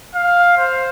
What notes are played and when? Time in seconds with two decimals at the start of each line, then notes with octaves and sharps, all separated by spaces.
0.15 F5
0.58 C5